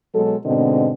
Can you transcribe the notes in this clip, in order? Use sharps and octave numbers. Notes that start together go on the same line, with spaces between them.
B2 F#3 G#3 A4
G#2 B2 D3 C4 D#5